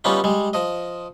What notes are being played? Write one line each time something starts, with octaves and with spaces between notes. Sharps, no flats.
G3 B3 C#4 D#4 F4 G4
G3 G#3
F3 D#5